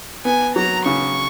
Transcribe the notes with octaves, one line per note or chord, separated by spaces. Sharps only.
B3 G#5
F#3 A#5
C#3 C#6